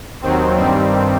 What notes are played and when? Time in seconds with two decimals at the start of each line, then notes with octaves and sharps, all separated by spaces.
0.21 D#2 D#3 F#3 C4
0.56 G2 D#3 G3 C4